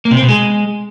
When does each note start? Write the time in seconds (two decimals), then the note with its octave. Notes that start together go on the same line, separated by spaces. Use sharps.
0.05 A#3
0.11 C3
0.17 C4
0.23 B2
0.28 G#3